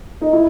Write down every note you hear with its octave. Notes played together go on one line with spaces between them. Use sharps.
D#4
E4